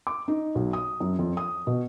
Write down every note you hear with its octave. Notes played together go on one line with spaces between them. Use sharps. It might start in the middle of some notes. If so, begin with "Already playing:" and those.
D6
D#4
B1
D#6
F#2
F2
D#6
B2